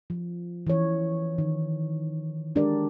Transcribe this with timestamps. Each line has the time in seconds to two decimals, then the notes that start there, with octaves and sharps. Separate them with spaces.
0.10 F3
0.67 E3 C#5
1.38 D#3
2.55 G#3 D4 G4 A#4 D5